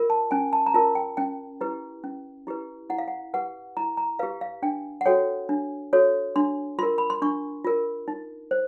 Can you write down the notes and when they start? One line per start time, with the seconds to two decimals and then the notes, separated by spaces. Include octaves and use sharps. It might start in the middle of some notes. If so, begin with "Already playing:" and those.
Already playing: F4 A#4
0.10 A5
0.31 C#4 G#5
0.53 A5
0.66 A#5
0.74 F4 A#4 A5
0.95 G5
1.17 C#4 G5
1.61 E4 G4 B4
2.04 C#4
2.47 E4 G4 B4
2.90 E4 F#5
2.98 F5
3.08 F#5
3.34 G4 B4 F#5
3.77 E4 A#5
3.97 A#5
4.19 G4 B4 F5
4.41 F5
4.62 D4 G5
5.01 F#5
5.06 F#4 A4 C#5 G5
5.49 D4
5.93 F#4 A4 C#5
6.36 D4 C6
6.79 F4 A#4 C6
6.98 B5
7.10 C6
7.22 D4 C#6
7.64 F4 A#4
8.08 D#4
8.51 C5